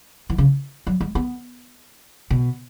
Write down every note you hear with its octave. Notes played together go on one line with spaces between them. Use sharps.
E3
C#3
F#3
G#3
B3
B2